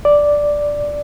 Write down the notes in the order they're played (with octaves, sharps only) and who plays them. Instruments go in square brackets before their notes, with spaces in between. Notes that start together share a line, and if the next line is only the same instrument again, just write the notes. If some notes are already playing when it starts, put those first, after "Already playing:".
[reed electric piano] D5